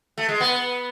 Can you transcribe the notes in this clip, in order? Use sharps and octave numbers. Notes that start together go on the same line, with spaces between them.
A3
G#3
B3